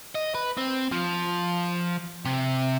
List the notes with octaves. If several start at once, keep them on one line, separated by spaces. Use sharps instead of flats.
D#5
B4
C4
F3
C3